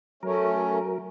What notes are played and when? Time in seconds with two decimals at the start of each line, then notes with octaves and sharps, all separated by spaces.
0.23 F#3 A3 C#4 A#4